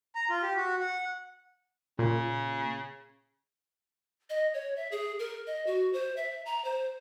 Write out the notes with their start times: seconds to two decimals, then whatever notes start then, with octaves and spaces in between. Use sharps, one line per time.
0.15 A#5
0.30 F4
0.42 G4
0.57 F#4
0.81 F#5
1.99 A#2 C#3
4.30 D#5
4.54 C#5
4.76 E5
4.92 G#4
5.19 A#4
5.47 D#5
5.67 F#4
5.93 C5
6.17 E5
6.46 A#5
6.64 C5